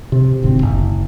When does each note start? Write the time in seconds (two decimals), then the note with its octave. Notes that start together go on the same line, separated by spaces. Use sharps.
0.12 C3
0.43 D1 G#1 C4
0.62 F#1